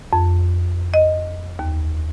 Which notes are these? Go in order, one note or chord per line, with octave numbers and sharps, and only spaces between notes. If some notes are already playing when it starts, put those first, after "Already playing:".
F2
D#5
D#2